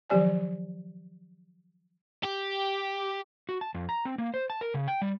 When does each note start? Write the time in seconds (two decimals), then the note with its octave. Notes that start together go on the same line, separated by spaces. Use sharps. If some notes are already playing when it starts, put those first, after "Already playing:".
0.10 D#3 F3 F#3 G4 D5 G#5
2.24 G4
3.49 F#4
3.61 A5
3.75 F2
3.89 A#5
4.05 C4
4.18 A#3
4.34 C5
4.50 A5
4.61 A#4
4.74 C#3
4.88 G5
5.02 G3